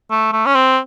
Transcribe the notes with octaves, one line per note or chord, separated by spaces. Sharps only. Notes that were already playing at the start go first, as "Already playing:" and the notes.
A3
A3
C#4
C4